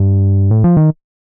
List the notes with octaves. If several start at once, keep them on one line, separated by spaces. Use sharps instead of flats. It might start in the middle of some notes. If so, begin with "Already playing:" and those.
Already playing: G2
A2
F3
D#3